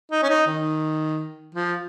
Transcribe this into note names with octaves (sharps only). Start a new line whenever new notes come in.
D#4
C#4
D#4
D#3
F3